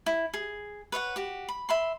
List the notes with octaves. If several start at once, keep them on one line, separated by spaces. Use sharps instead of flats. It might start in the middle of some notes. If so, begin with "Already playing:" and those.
E4
G#4
B4 C#5 D5 F#5
F#4 G4
B5
E5 B5 C6